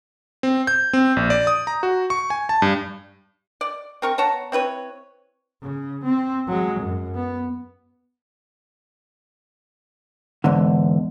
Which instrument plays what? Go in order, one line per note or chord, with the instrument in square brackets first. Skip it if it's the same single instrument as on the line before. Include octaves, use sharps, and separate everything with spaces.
[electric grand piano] C4
G6
C4
A#1
D5
D#6
A#5
F#4
C#6
G#5
A5
G2
[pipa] D5
C4 A#4 C#6
B3 C#5 A5 A#5
C4 E4 B4 C#5
[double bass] C#3
C4
F#3 G#3
F#2
B3
[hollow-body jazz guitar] E2 G#2 D3